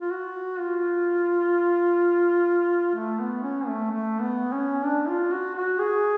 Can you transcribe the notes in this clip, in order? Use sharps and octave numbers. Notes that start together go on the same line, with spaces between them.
F4
F#4
F4
A3
B3
C#4
A3
A3
B3
C#4
D4
F4
F#4
F#4
G#4